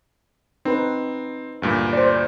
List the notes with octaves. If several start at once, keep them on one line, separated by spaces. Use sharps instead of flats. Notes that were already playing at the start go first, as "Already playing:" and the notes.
C4 D#4 B4
D2 G2 A#2
C5 D5